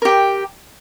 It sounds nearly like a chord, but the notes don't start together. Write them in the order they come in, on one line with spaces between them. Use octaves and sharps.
A#4 G4 G5